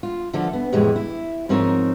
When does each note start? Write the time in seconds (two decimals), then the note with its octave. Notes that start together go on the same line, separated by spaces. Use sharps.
0.03 F4
0.33 D3 F3 A3 A4
0.53 B3
0.72 F2 A2 C3 E3 G#3 G4
0.96 E4
1.49 G#2 F3 C4 D#4 A#4 C#5